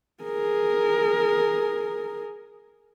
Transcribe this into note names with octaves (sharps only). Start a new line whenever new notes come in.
G#4 A#4